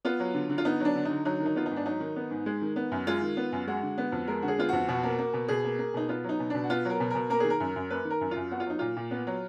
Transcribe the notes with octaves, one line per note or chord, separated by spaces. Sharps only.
B3 F4
F#3
D3
D3
F4
B3 D#4
F#3 D4
D3
D3 D#4
F#3 D#4
D#3
D#4
B3 F4
D#4
G#2
D4
F#3 D#4
D#3
B3
G#2
G#3
D#3
B3
F#2
G#3 F4
D#3
B3
F#2
G#3 F#4
D3
B3
F2
G#3 A#4
D3 F#4
G#4
B3 F4
F2 F#4
B2 F#4
A#3
A#3
B2
B2 G#4
A#3
A#3
B2 D#4
B3 F4
F#3 D#4
B2
B2 D4
F#4
B3 F4
F#3 A#4
B2
B2 A#4
A#3 A#4
D#3 G#4
A#4
F#2
F#2
A#3 B4
D#3
A#4
F#2
F4
F#2
B3 F#4
F4
F#3 D#4
A#2 F4
A#2
B3
F#3